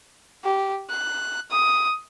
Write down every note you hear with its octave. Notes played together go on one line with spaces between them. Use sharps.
G4
F#6
D#6